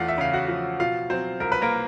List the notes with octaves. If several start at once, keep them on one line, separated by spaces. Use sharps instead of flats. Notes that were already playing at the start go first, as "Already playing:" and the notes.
Already playing: E2 A3 F4 F5 F#5
E5
C#3 F5
F#4 F#5
F3
B2 F4 F5
F#3 C4 C5
C2 A#4
B4
A#3 A#4